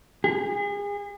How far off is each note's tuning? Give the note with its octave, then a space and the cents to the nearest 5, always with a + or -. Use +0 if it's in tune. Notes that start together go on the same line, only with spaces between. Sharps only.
G#4 -35